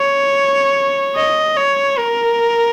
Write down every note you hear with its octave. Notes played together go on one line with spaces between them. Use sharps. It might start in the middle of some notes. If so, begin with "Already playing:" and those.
Already playing: C#5
D#5
C#5
A#4